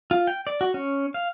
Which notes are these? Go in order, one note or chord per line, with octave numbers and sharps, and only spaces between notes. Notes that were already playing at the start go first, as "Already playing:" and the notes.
F4
G5
D5
F#4
C#4
F5